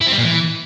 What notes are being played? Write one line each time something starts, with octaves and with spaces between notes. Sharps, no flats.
E4
C4
G3
A#2
E3